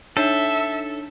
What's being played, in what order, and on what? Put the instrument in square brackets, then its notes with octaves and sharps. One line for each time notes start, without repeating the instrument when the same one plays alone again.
[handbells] D4 D#4 C#5 [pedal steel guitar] A4 [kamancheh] E5